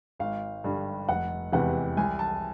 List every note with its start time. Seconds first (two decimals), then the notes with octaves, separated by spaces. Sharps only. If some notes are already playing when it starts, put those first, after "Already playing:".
0.19 G#1 F5
0.64 G2 D3 G3
1.08 F1 F#5
1.52 E2 C3 E3 F#5
1.97 C2 G#5
2.19 A5